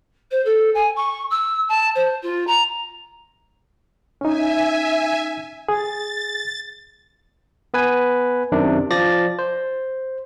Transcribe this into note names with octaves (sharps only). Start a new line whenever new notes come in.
C5
A4
G#5
C#6
E6
A5
C5
F4
A#5
C#4 D#4 E5 G#5
G#4 A6
B3 B4 G#5
F#2 C3 D#3 D4
F3 D5 A6 A#6
C5